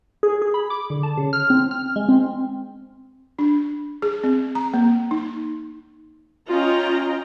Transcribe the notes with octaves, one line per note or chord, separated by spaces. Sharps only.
G#4
G#4
B5
D6
D3
A5
C#3
F6
C4
F6
G#3
C4
D4
G#4
C4
A#5
A#3
D#4
C#4 F4 D#5 G5 A#5